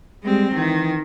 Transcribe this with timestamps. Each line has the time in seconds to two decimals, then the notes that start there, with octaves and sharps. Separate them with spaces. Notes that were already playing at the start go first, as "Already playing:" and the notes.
0.23 G3 G#3 C4
0.55 D#3 E3